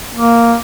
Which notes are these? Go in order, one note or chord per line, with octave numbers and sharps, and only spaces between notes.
A#3